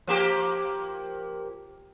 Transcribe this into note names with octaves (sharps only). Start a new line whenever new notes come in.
F3 A#3 G4